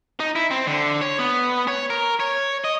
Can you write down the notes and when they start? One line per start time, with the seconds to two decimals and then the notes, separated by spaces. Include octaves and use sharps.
0.20 D#4
0.35 E4
0.51 C4
0.67 D3
1.02 C#5
1.19 B3
1.68 C#5
1.90 A#4
2.20 C#5
2.64 D#5